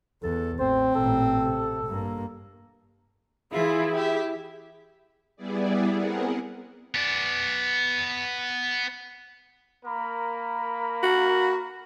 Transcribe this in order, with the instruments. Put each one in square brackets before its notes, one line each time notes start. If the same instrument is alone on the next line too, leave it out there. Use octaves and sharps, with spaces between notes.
[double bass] E2 [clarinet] A4
[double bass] A1 [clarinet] C4 [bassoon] C5
[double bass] A1 A#2 [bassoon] A4
[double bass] C3
G2 A#3
[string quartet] E3 F4 [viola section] E4 [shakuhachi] G#4
[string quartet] G4 E5
[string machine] G3 B3 E4 G#4 D5
B3 C4 G#4 A#4 F#5
[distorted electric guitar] B3 D5
[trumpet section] A#3 A#4 B5
[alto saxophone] F#4